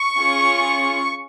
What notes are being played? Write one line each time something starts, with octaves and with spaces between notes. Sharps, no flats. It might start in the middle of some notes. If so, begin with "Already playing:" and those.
Already playing: C#6
C#4 F4 G#4